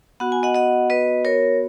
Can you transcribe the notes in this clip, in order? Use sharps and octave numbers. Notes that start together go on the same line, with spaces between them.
B3 F#4 F#5
G#5
D#5 F#5
D#5 F#5
B4 D#5
A#4 C#5